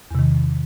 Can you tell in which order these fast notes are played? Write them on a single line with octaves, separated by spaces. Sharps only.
E2 C3 D#3